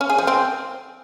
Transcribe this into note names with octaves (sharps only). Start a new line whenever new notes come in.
C#4
G#4
F3
C4